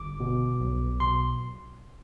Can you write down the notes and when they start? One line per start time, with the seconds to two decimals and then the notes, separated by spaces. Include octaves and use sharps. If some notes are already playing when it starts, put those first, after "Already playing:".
Already playing: G1 D6
0.20 B2
0.60 B1
1.00 B2 C6